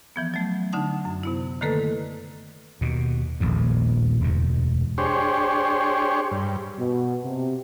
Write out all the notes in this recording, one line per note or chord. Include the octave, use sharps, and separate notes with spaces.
E3 F3 B3
F#3 A3
D3 D4 D#4 F#5 A5
F#2
C3 B3 E4
D3 D#3 A3 A#3 A4 B4
D#2 B2
D#1 A#1 E2 A2
E1 D2 G#2
D4 G4 G#4 C5 C#5
G2
B2
C3